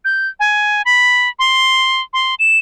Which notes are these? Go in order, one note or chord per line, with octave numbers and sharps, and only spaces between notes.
G6
G#5
B5
C6
C6
E7